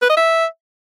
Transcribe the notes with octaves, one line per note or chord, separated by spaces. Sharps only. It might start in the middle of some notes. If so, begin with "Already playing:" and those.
B4
D#5
E5